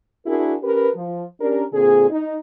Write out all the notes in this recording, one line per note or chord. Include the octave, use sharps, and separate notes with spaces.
D4 E4 F#4 G#4 A#4
C#4 G4 A#4 B4
F3
C#4 D4 G4 A#4
A#2 D3 C4 G#4
D#4